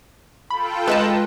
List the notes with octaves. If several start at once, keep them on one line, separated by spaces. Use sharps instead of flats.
F4 A4 G5 B5
G#3 B4 D#5 A5